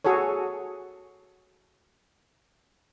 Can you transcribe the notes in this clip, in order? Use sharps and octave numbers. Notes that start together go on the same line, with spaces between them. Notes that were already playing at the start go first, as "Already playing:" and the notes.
F#4 G#4 A4 C#5